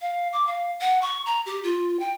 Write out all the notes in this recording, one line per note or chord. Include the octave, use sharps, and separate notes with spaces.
F5
D6
F5
F#5
C#6
A#5
G4
F4
G5